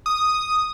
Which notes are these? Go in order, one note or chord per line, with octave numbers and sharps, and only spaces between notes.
D#6